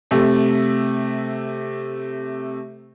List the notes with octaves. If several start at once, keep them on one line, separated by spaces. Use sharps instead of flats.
C3 A3